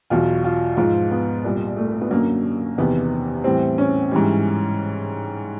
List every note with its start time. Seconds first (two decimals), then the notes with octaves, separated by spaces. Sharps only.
0.10 E2 B2 F#3 F4
0.44 F4
0.77 G#2 F3 F4
1.11 B3
1.44 C2 A#2 G3
1.77 A3
2.02 B3
2.11 F#2 D3 F#3 A#3
2.78 E2 C3 D#3 B3
3.44 A2 E3 G3 C4
3.78 C#4
4.11 G#2 E3 G3